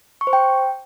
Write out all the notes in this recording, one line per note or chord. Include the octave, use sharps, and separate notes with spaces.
C#6
C5
G5